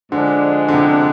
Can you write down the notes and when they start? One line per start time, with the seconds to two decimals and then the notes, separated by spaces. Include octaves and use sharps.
0.12 G#2 D3 F3 G#3 D4
0.68 D3
0.74 C3